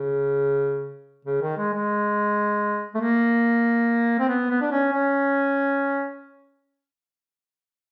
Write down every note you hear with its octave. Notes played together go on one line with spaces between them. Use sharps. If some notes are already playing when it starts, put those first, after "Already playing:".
Already playing: C#3
C#3
D#3
G#3
G#3
A3
A#3
C4
B3
B3
D4
C#4
C#4